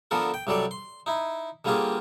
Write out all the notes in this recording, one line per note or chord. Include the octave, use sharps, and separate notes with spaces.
D3 F3 B3 A4 A#4
G5
C2 F#3 G3 A4 D5
C6
D#4 E4
D3 G3 A#3 C4 F4 G#4